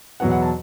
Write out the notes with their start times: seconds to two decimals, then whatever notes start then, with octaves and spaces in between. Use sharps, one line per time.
0.20 E2 B2 F#3 B3 F#5
0.31 F#5
0.42 A5